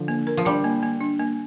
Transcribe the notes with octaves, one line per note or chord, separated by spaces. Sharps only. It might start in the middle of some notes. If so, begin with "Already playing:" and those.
Already playing: D3 F3
A#3
A#4
F3
G3 D4
A#3
A#3
D4
A#3